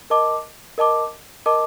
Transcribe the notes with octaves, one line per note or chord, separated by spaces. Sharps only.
A#4 D#5 A5 D6
A#4 D#5 A5 D6
A#4 D#5 A5 D6